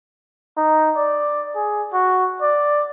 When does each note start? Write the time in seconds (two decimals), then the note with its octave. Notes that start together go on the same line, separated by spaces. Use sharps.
0.57 D#4
0.96 D5
1.56 G#4
1.94 F#4
2.42 D5